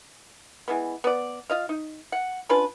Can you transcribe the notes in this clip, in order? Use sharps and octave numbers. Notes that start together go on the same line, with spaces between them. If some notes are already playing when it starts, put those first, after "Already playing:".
E3 G#3 B3
B3 D5
F4 D#5 F5
D#4
F#5
C#4 D4 F4 B4